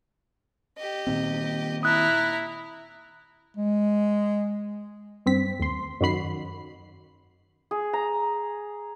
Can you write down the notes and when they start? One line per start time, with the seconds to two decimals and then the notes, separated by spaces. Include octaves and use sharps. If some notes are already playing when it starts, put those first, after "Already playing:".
0.78 G4 D#5
1.07 A#2 D#3 C4
1.83 E4 A#5 D#6 F#6
3.56 G#3
5.26 G2 C4 B6
5.60 D#2 C6
6.01 F#2 D#3 F#4 B5 C7
7.71 G#4
7.93 A#5